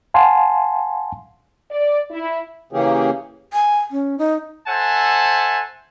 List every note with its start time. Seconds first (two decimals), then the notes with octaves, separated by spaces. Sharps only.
0.14 F5 F#5 G#5 A5 C6
1.70 D5
2.10 E4
2.72 C#3 E3 A#3 C#4 G4 G#4
3.53 G#5
3.91 C#4
4.18 D#4
4.68 A4 C5 E5 F#5 G#5 A5